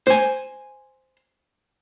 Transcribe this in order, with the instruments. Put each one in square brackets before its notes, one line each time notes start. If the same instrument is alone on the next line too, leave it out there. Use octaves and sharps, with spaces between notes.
[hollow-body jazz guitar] C5 G#5